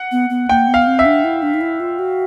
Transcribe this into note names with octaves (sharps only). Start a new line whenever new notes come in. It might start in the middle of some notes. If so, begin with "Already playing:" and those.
Already playing: F#5
B3
B3
A#3 G5
B3
F5
C4
E5
D4
E4
D4
D#4
E4
F4
F#4